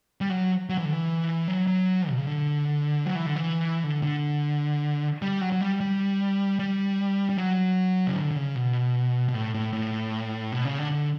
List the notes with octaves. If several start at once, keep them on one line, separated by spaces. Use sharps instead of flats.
G3
F#3
F#3
E3
D3
E3
F#3
F#3
B2
C#3
D3
F#3
E3
D3
E3
D3
D3
G3
F#3
F#3
G3
G3
G3
G3
F#3
C#3
D3
D3
C#3
B2
B2
A2
A2
A2
B2
C#3
D3
D3